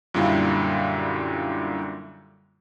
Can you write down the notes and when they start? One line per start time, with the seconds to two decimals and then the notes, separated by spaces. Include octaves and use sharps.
0.14 F#2 A#2 D3 G3 E4 F5